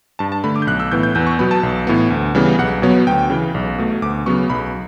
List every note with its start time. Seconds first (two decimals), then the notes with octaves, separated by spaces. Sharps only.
0.19 G2 A5
0.32 A5
0.44 D3 A3 B5
0.56 D6
0.62 G6
0.67 B1 F#6
0.80 E6
0.91 A2 E3 B3 G6
1.03 G6
1.15 E2 G6
1.27 C#6
1.39 B2 F#3 B3 B5
1.51 A5
1.63 B1
1.87 A2 E3 B3
2.10 D2
2.35 C#3 E3 G3 B3
2.58 B1 F#5
2.82 B2 F#3 B3 C#5
3.07 D2 G5
3.30 C#3 E3
3.54 B1
3.78 B2 A3
4.02 D2 D6
4.26 C#3 F#3 B3 C#6
4.50 B1 B5